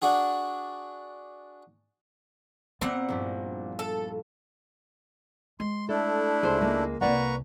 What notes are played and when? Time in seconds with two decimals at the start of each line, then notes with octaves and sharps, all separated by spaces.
0.02 D4 F#4 G#4
2.81 A#2 B3 C4 F#5
3.09 A#1 G2 E4
3.79 A4
5.60 G#3 C6
5.89 A3 D4 E4 A4
6.43 C#2 G#4 C5
6.61 G#3 A#3
7.01 C2 C3 A#3 B4 D5 F#5 A#5 C#6